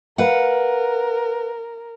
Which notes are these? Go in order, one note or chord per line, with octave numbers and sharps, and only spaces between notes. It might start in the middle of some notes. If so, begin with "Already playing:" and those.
A#4 B4 F5 F#5